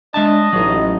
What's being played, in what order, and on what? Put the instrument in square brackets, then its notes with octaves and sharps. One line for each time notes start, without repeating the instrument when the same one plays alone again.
[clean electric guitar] G#3 E5 A5 [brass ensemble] D4 [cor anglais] D#5
[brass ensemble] A1 [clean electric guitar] F#3 D#4